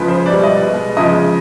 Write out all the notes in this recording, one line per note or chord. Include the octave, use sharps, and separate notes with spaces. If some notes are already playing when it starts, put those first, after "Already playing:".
Already playing: C#3 F3 G#3 B4
C5
B2 G3 D5
D#5
B2 G#3
C#3 F3 G#3 D#5